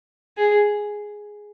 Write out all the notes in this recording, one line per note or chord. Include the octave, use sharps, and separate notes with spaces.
G#4